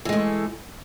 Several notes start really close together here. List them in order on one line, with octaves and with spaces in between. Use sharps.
E3 G#3 A3